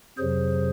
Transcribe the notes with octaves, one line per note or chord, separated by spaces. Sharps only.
F2 C3 F#3 G#4 C5